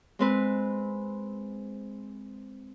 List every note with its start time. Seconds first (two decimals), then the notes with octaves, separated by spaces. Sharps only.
0.19 G#3 C4 B4